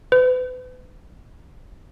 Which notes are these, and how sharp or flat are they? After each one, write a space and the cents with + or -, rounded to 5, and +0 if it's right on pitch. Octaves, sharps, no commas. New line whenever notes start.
B4 +40